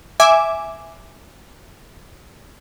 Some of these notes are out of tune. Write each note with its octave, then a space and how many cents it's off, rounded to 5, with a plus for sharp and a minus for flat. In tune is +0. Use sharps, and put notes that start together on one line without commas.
E5 +0 G#5 +0 D6 +0